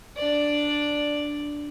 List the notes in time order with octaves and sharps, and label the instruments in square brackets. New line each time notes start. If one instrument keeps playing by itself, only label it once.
[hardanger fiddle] D4 D5